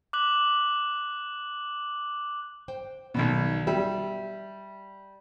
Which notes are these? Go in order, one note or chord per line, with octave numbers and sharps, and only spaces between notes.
D6 F#6 F#7
C5 G5
B1 B2 D#3 G3
G3 E5